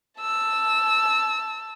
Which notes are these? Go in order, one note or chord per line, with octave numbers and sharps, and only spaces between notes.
A5 E6